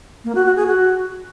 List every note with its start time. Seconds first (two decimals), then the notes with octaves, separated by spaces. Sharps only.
0.24 A#3
0.35 F#4
0.46 F#4
0.56 G#4
0.67 F#4